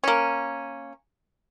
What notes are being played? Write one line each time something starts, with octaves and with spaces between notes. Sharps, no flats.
A#3 C#4